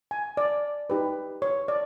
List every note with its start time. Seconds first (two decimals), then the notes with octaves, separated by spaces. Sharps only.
0.11 G#5
0.37 D5
0.90 D#4 G4 B4
1.42 C#5
1.68 D5